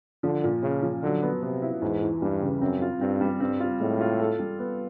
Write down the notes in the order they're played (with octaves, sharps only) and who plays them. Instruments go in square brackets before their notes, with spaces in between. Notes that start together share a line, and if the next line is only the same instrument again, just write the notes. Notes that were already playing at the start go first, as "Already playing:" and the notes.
[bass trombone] D3 [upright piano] F3
[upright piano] A#2
[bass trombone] C#3 [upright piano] C#4
[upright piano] F3
[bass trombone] D3 [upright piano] F#3
[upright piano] B3
[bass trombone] C3 [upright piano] B3
[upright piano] E4
[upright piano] E2 [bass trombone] G#2
[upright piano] E3
[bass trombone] G2 [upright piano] G3
[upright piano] C#3
[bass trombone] F#2 [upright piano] C4
[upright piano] F4
[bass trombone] G2 [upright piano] C4
[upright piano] G3
[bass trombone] G2 [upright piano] C4
[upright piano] F4
[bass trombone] A2 [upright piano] G#3
[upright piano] F4
A4
G3
B3